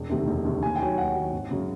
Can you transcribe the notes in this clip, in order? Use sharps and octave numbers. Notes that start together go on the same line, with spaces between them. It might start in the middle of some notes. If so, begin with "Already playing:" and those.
Already playing: E1
D2 C3 D#3
E1
D2 C3 D#3
D#2 G#5
G5
D#3 F#3 G#5
D#2 F#5
D#3 F#3
G#1
F#2 C#3 F#3